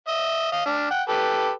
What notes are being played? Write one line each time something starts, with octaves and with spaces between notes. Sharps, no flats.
D#5 E5
D#5 F5
D4 F6
F#5 G5
G4 A4 B4